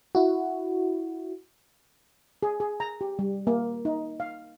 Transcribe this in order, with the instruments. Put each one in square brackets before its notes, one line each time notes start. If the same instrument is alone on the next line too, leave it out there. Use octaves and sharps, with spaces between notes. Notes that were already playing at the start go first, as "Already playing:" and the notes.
[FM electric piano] E4 F#4
[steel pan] G#4
G#4
A#5
G4
G3
A#3
D#4
F5